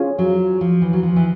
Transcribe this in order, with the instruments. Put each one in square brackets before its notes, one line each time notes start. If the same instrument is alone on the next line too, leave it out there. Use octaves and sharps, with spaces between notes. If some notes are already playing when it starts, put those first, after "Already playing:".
Already playing: [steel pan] C#4 F4 G#4
[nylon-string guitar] F#3
F3
E3
F#3
F3
E3